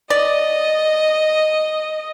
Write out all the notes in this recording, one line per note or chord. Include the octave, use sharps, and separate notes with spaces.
D5 D#5